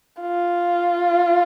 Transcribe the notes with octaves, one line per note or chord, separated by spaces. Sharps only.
F4